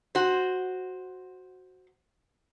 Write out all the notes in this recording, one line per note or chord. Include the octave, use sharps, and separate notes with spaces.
F#4 C5